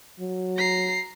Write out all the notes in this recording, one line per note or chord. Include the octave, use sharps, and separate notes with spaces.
F#3
A#5 C7